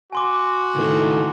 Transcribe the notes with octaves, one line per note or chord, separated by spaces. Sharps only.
F#4 G#5 C6 D6
C#2 A2 D#3 A3